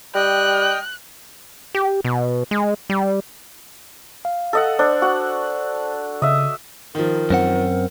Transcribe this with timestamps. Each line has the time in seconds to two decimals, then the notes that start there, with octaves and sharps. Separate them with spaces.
0.15 G3 D#5 G5 F#6
1.75 G4
2.04 B2
2.51 G#3
2.90 G3
4.25 F5
4.53 A4 D#5 F#5
4.79 D4 C5
5.02 F#4 F#5
6.22 C#3 D#5 E5
6.95 D#3 F3 A#4
7.30 F#2 C4 F#5